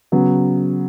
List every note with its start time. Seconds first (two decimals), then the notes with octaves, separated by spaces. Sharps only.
0.12 C#3 F#3 B3